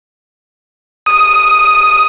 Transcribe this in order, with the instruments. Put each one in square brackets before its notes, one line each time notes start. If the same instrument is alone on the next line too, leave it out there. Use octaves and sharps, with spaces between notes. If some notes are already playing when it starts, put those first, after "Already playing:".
[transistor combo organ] D#6